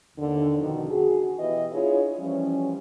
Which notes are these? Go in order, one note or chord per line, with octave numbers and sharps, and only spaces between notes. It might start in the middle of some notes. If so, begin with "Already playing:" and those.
D#2 D3
F2 B2 D#3
F#4 G#4
B2 E3 E4 G4 B4 D#5
D4 E4 F4 G#4 C#5
E3 F3 G3 C#4